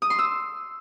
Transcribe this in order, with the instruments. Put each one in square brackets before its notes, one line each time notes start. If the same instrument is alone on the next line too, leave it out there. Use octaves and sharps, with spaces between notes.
[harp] D#6
C6
E6